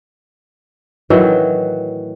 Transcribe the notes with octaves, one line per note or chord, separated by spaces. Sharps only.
A2 D#3 E3 F#3